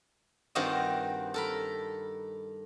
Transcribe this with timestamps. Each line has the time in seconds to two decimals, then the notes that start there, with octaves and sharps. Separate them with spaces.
0.55 G2 D#3 C4 F4 F#4 D#5
1.34 A4 A#4 B5